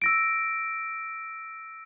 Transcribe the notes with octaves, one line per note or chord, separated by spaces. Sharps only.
E6 A#6 D7